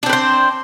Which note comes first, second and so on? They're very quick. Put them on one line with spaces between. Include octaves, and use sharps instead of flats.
D4 C4 B4 C5